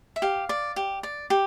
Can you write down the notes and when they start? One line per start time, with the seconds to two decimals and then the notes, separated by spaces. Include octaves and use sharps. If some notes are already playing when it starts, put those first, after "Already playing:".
0.16 E5
0.22 G4 F5
0.49 D5
0.76 G4
1.03 D5
1.30 G4